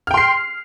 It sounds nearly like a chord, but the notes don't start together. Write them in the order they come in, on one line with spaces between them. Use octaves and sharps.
F6 G5 C6 C7